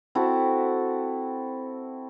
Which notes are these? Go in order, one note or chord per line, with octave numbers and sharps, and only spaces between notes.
C4 E4 F#4 A4